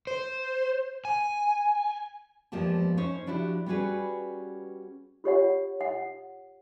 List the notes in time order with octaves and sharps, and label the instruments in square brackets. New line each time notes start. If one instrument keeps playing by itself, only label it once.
[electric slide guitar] C5
G#5
[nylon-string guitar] E2 G#2 F3 A#3 G4 A5
C#4 D#4 C5 C#5
F3 D4 E4 F#4 G4
G3 B3 C#4 F#4 G#4 B4
[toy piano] F4 G4 C#5 F#5
F#5